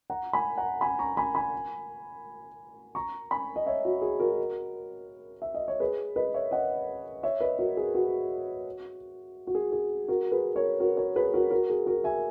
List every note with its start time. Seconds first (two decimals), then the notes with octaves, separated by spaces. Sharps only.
0.10 F#5 A#5
0.33 G#5 B5
0.58 F#5 A#5
0.81 G#5 B5
0.99 A#5 C#6
1.17 G#5 B5
1.35 G#5 B5
2.95 A#5 C#6
3.31 G#5 B5
3.56 D#5
3.66 C#5 E5
3.85 F#4
4.02 G#4
4.20 F#4 A#4
5.42 E5
5.54 D#5
5.68 C#5
5.80 G#4 B4
6.16 B4 D#5
6.34 C#5 E5
6.51 D#5 F#5
7.23 C#5 E5
7.40 B4 D#5
7.59 F#4 A#4
7.77 G#4
7.95 F#4
9.47 F#4
9.55 G#4
9.72 G#4
10.08 F#4 A#4
10.32 G#4 B4
10.55 A#4 C#5
10.80 F#4 A#4
10.97 A#4 C#5
11.16 G#4 B4
11.34 F#4 A#4
11.51 F#4 A#4
11.70 G#4
11.86 F#4 A#4
12.04 E5 G#5